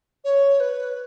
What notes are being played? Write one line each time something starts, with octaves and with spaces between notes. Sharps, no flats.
C#5
B4